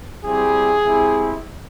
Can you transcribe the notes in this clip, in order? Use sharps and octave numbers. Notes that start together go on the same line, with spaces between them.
G3 C4 E4 G4 G#4
G#3 C4 E4 G4